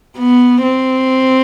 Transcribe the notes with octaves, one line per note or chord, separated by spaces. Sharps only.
B3
C4